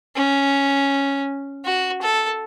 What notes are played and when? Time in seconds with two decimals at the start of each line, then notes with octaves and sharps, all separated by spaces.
0.16 C#4
1.65 F#4
2.02 A4